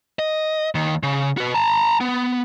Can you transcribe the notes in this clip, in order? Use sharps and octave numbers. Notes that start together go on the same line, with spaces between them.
D#5
D#2 D#3
C#3
F#4 B4
A5 A#5
B3